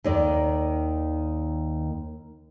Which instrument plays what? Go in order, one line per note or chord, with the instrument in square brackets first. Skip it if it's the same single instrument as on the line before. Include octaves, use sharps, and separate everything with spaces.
[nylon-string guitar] D#2 D#3 D5